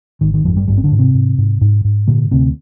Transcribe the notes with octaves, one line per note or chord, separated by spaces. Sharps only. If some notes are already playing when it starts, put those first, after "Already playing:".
G#1 D#3
D#3
G#1 F2 F3
G2 G3
G#1 G2 G3
C4
D3 D4
G#2
C3 C4
G#2
G#2
G#2
G#2
A#2 D3 A#3
D2 C3 C4